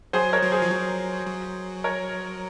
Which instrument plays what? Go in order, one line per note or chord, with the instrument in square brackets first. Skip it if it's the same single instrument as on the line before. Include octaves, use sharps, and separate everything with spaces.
[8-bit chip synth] F#3 [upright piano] G#4 C5
[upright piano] A#4 C#5
[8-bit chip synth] F#3
[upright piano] G#4 C5
[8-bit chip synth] F3
F#3
F#3
[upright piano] A#4 C#5